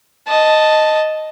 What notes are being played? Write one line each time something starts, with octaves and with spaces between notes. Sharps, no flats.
D#5 A5